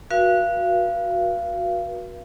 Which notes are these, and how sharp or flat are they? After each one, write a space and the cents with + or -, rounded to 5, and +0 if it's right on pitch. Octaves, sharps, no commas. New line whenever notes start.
F#4 -15 B4 -45 F5 -30